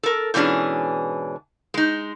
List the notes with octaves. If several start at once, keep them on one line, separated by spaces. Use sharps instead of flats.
A4 A#4
G#2 B2 E3 C#4 D4 G#4
G#3 D#4